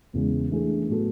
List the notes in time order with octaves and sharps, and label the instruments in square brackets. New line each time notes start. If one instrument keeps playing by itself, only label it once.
[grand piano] E2 C#3 E3 G#3
E3 A3 D4 G#4
A2 F#3 B3 F#4 A4